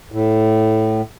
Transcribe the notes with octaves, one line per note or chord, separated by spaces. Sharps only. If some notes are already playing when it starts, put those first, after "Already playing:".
A2